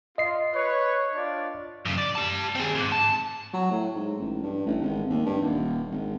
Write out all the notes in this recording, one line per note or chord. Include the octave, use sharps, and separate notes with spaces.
F4 D#5 C7
B4 C#5
D4 F4 D5
F#2 C#3
D5
G4 A5
C4 G#4
C2 G#2
A5
F#3
A2
G#2
A1
G2
A1
G#1
D#2
G2
D#1
G#1